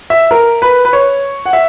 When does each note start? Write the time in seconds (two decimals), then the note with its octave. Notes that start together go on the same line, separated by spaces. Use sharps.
0.10 E5
0.31 A#4
0.62 B4
0.85 B4
0.93 C#5
1.46 F#5
1.53 E5